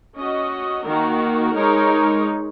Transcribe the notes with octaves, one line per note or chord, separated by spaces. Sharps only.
C#4 F#4 D#5
D#3 A#3 F#4 A#4
G#3 D#4 A#4 C#5